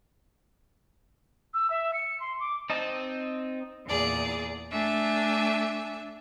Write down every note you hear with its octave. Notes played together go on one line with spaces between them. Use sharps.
E6
E5
C#7
C6
D6
C4 D#4 D#5 A5
E2 A#2 G#4 D5
A3 D4 E5 G#5